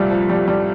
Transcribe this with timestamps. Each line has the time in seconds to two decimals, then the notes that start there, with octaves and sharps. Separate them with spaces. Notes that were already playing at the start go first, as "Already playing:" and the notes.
Already playing: C2 A#2 G3 A3
0.11 F3
0.29 G3
0.48 G3